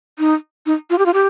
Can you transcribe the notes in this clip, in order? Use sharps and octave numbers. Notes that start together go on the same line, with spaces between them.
D#4
D#4
F4
G4
F4
G4